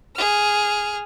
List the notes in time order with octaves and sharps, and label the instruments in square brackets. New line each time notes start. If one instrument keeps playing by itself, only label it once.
[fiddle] G#4 F6